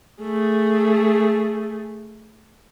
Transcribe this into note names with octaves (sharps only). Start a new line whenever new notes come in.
A3 G#4